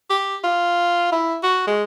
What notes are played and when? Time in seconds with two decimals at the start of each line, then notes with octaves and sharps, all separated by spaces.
0.10 G4
0.44 F4
1.12 E4
1.43 F#4
1.67 G#3